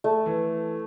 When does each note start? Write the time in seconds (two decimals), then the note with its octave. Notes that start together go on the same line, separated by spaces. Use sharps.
0.04 A3
0.26 E3